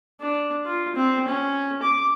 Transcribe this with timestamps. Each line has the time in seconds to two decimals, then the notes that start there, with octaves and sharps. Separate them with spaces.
0.21 D4
0.65 F4
0.96 C4
1.28 C#4
1.83 D6